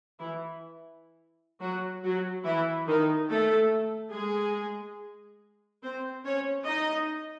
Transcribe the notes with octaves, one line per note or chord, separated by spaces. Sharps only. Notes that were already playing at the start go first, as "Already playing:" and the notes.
E3 E4
F#3 F#4
F#3 F#4
E3 E4
D#3 D#4
A3 A4
G#3 G#4
C4 C5
C#4 C#5
D#4 D#5